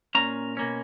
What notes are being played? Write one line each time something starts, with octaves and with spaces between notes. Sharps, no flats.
A#2 A#3 C#4 A#5
B2 A#3 C#4